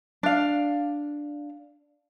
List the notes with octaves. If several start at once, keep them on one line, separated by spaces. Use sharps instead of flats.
D4 F5